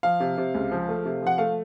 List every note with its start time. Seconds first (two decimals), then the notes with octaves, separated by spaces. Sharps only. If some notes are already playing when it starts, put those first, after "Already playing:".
0.03 F3 F5
0.20 C3
0.38 C3
0.54 C#2
0.72 F3
0.89 A3
1.05 C3
1.22 F3 F#5
1.38 A3 F5